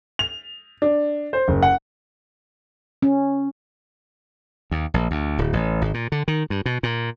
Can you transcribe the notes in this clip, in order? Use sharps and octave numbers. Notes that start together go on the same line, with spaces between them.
F7
D4
C5
F#1
F#5
C#4
D#2
A#1
D2
D1
A1
G#1
A#2
D3
D#3
G2
B2
A#2